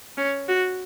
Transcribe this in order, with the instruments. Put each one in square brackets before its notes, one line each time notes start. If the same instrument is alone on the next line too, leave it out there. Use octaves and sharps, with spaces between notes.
[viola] C#4
F#4